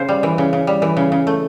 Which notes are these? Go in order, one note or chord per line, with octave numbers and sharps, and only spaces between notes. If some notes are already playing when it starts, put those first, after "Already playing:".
Already playing: C#3 C5
G3
E3
C#3
C#3
G3
E3
C#3
C#3
A3